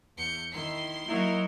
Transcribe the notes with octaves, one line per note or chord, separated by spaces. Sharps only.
E2 G6 C#7
D#3 E4 C6 C7
F#3 A#3 D#4 E4 A#4